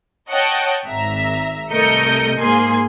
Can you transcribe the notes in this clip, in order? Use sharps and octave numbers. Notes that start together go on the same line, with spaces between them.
C#5 D#5 F#5 G5 A5
G#1 E5 A#5
C2 A3 A#4 D#5 G6 C#7
G#2 A#3 G#4 G#5 C6